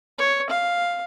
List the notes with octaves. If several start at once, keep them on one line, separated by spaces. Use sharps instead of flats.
C#5
F5